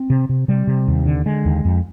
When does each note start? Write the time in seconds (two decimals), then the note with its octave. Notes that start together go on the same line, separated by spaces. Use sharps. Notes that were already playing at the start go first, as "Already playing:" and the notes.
Already playing: C4
0.10 C3
0.29 C3
0.48 C3 G3
0.67 C3
0.88 D#2
1.06 D3
1.26 D3 G#3
1.45 D#2
1.65 F2